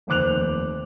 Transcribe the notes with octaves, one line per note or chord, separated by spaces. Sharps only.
F1 D#2 C5 D6 F#6 F7